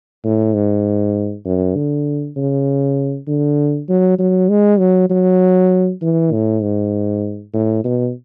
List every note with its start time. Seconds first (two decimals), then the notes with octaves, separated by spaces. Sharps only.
0.24 A2
0.54 G#2
1.45 F#2
1.76 D3
2.36 C#3
3.27 D3
3.89 F#3
4.19 F#3
4.49 G#3
4.79 F#3
5.10 F#3
6.02 E3
6.32 A2
6.62 G#2
7.54 A2
7.84 B2